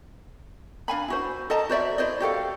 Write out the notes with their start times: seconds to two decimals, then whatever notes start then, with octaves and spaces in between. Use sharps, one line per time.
0.88 D4 F5 G#5 B5
1.08 E4 F#4 C5
1.50 A4 D#5 A5 A#5
1.70 F#4 C5 D5 E5
1.98 E4 C5 D5 D#5
2.20 F#4 G4 A4 F5